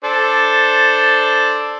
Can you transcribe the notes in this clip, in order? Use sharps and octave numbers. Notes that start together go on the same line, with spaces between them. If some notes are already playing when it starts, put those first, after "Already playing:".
D4 A4 C5